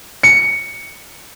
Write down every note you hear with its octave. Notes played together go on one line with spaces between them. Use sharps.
C#7